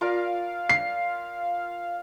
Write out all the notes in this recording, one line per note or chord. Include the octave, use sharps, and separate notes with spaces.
F4 A#4 D5 F5
C7